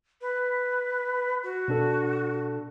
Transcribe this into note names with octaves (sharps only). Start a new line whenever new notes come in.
B4
F#4
B2 D4 A4